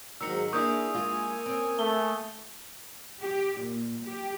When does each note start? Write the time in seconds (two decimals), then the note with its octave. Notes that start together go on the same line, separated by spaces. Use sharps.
0.21 G#2 D#3 F#3 D#4 E6 C#7
0.53 A#3 D4 E4 G#4 C#6 D#6 G6
0.94 G#3 A#3 F4 G#5
1.46 C4 C#4
1.79 A3 G7
3.20 G4
3.58 A#2
4.03 G4